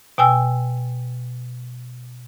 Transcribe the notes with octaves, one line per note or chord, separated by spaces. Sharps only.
B2 G5 G#5 E6